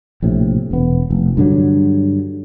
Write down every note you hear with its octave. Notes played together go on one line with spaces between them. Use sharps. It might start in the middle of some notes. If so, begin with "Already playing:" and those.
A#1 A2 C3
E1 B3
F1
G2 D3 F#3